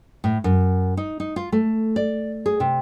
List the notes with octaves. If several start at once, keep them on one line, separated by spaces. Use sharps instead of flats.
A2
F#2
D#4
D#4
F4
A3
D5
G#4
C3